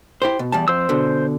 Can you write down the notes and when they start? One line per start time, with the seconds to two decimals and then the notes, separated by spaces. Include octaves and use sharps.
0.22 E4 G4 C5
0.39 B2
0.52 E2 G3 A5
0.68 F2 C5 E6
0.89 B2 D3